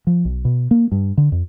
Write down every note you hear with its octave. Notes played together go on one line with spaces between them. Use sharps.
F3
B1
B2
A#3
G2
D3
F2